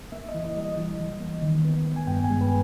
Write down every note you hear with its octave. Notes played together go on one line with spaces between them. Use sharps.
A#3 E5
D#5
E3
D#5
G3 D#5
E3
E3
A#3
D#3
B3
B3
G#5
G2 G5
G#5
G#3
B4